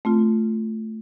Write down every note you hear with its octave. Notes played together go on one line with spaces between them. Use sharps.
A3 C4 F4